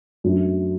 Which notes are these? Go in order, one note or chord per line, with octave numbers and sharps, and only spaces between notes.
F#2 F#3 A3 D4